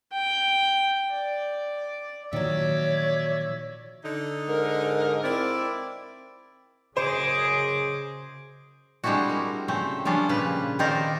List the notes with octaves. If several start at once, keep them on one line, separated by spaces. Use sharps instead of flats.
G5
D5
A#2 D#3 F3 F#3 C#5 D5 E5
D3 D#4
G#2 A#4
C4 E4 D5
F#2 C#3 G#4 C5 D#5 D6
G3 G#3 C4 D4 E4 F#4
A#4
C#3 A3 C4
F3 G3 C#4 D4 F4
A#2 C#3 B4
D#3 C4 D#4 A#4 C5 D5